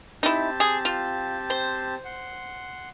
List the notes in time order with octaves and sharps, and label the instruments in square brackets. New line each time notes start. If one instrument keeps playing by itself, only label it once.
[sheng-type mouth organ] C4 G4 A5 [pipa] D#4 E4
[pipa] G#4
F4
C5
[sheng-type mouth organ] F#5 C6